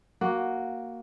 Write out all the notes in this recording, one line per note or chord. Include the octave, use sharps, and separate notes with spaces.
A#3 F#4